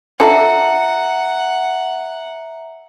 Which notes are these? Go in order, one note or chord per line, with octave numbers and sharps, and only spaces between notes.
D4 F4 A4 E5 F#5 A#5 C#7